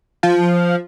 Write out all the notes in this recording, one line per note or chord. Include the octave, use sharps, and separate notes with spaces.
F3